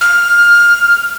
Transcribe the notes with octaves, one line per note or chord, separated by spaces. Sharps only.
F6